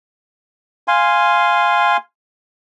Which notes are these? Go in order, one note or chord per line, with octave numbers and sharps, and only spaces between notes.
F5 G#5 C6